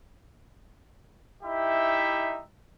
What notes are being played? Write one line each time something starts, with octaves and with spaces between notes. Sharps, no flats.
D#4 E4 G4 E5